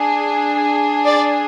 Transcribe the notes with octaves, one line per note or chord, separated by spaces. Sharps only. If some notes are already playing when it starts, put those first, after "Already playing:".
Already playing: D4 G#4
D5